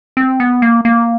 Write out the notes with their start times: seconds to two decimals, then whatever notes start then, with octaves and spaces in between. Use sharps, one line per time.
0.17 C4
0.40 B3
0.62 A#3
0.85 A#3